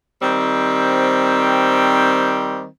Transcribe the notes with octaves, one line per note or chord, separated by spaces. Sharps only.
D#3 G3 C4